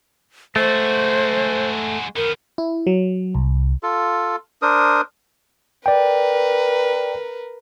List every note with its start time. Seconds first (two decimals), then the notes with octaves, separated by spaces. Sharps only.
0.56 G#3 A3 F#4 C5
2.16 D#3 B3 A#4
2.58 E4
2.87 F#3
3.35 C2
3.82 F4 A4
4.62 D4 A#4 C5 D#6
5.86 A#4 B4 D5 G5